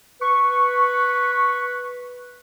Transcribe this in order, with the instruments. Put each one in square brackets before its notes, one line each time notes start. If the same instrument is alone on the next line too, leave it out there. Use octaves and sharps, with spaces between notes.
[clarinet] B4 [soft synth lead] C#6